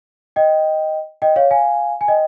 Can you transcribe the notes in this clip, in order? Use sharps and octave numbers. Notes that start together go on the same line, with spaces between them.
D#5 G5
D#5 G5
C#5 F5
F5 G#5
G#5
D#5 G5